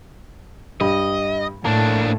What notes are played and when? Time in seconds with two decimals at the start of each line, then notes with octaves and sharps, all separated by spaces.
0.81 G2 D#5
1.65 A2 A#3 D4 A5